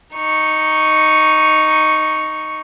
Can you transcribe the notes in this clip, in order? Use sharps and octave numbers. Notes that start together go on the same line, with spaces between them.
D#4 C#6